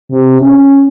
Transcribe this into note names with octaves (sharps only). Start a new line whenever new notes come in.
C3
C#4